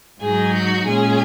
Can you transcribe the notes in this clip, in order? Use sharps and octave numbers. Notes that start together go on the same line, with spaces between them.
G#2 F#3 D#4 G#4
F#4
A#2 G#3 C#4 G#4